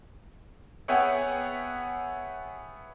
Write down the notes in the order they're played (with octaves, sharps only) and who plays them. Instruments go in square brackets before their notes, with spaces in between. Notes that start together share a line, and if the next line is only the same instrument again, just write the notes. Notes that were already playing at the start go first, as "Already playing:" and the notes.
[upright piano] B3 G#4 C#5 E5 F#5 G5